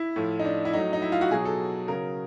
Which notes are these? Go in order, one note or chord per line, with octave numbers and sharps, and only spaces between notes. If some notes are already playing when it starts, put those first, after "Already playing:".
Already playing: E4
A2 F3
D#4
D4
E4
A2 F#3 D#4
D#4
E4
F4
F#4
B2 F#3 G#4
A4
C#3 F#3 A#4